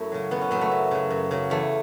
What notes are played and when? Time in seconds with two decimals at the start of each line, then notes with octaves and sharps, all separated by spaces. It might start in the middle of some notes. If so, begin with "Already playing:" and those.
Already playing: F#2 A3 E4
0.12 C#3 F#3
0.31 F#2 B3
0.41 C#4
0.51 C#3 F#3 B3
0.61 A3
0.72 F#2
0.91 C#3 F#3
1.10 F#2
1.31 C#3 F#3
1.50 E2 A3